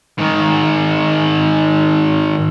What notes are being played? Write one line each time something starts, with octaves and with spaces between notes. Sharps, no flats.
G#2 D#3